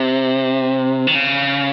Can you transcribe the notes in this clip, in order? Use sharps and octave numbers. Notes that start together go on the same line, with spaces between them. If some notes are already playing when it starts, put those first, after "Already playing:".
Already playing: C3
D#3
C#3